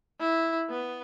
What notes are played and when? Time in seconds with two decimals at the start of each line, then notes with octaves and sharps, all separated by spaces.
0.20 E4
0.70 B3